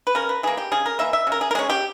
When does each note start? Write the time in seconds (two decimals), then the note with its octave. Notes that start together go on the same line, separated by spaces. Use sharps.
0.07 B4
0.15 C#3 A#4
0.29 B4
0.43 E3 A#3 G#4
0.57 G4
0.72 C#3 G#4
0.86 A#4
0.99 E3 A#3 E5
1.13 E5
1.27 C#3
1.32 A#4
1.41 G#4
1.51 A#4
1.55 G#3 C#4 G#4
1.70 G4